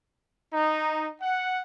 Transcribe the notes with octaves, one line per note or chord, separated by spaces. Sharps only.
D#4
F#5